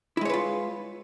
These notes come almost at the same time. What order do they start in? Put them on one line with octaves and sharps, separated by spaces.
E4 G#3 C#5 B4 F4